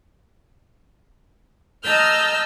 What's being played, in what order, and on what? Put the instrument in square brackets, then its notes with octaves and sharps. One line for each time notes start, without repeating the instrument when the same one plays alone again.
[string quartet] D#5 A5 A#5 E6 F6 G6